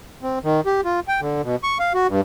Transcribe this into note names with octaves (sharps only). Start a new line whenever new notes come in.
C4
D#3
G4
F4
G5
D3
B2
C#6
F5
F#4
G2